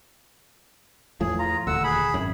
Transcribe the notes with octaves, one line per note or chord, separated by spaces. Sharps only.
E2 A2 F3 G#4
F4 A#5
D#1 D2 F#5 E6
G#4 B5
G#1 F#2